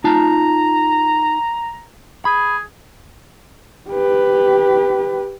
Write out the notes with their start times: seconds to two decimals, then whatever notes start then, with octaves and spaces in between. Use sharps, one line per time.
0.04 D#4 F4 A5 A#5
2.25 G#4 B5
3.90 G4 B4